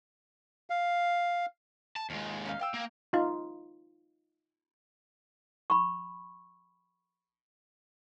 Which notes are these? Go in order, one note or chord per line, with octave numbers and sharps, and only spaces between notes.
F5
A5
D#2 G#3 F4
C#4 D#4 F5
F5 G5 E6
A#3
D#4 F4
B5 C#6